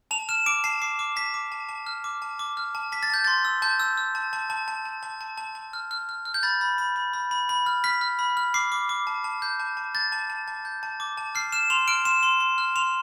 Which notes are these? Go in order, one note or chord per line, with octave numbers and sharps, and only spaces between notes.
A5 F7
F6 E7
D6 D7
A5 C7
D6 C7
D6
A5 B6
D6
A5
A5
F6
D6
A5
D6
F6
A5
A5 B6
A6
A5 G6
C6 A6
E6
A5 G6
E6
E6
A5
A5
A5
A5
A5
A5
A5
A5
A5
F6
F6
F6
F6
G6
B5 A6
B5
B5
B5
B5
B5
B5
F6
F6 B6
F6
B5
F6
D6 C7
D6
D6
A5
A5
G6
A5
A5
G6 A6
A5
A5
A5
G6
A5
D6
A5
F6 C7
F6 E7
C6 F7
F6 D7
C6 E7
C6
C6
F6
C6 F7